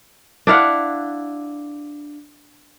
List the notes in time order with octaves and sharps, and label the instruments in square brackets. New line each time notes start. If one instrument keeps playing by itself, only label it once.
[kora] D4 E4 F5 F#5